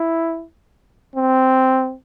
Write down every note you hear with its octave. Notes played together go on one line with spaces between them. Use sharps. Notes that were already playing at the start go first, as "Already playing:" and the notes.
Already playing: E4
C4